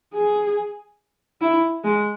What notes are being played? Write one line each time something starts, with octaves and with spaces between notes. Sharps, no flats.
G#4
E4
G#3